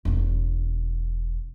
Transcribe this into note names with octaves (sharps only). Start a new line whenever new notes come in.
E1 C#4